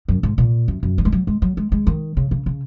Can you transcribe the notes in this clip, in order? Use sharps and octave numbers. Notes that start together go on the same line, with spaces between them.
F#2
G#2
A#2
F#2
F#2
F#3
G#3
F#3
G#3
F#3
G#3
G#3
D#3
C#3
C#3
C#3